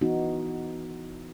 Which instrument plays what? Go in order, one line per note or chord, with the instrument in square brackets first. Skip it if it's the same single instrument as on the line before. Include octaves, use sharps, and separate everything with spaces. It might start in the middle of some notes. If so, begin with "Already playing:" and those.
[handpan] E3 B3 D#4 F#4